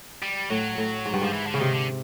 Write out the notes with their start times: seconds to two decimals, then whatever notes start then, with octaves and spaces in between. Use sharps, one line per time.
0.22 G3
0.50 A2 F#3
0.78 A2
1.06 G#2
1.14 G2
1.22 G#2 F3
1.33 E3
1.47 D3
1.54 C#3 E3
1.60 C3 D#3
1.74 D3